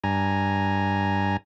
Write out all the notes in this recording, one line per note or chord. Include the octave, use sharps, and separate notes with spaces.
G2 G#5 A#5